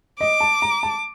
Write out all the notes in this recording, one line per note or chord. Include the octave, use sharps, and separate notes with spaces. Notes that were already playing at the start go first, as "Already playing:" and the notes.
D#5 D6
A5
A#5
A5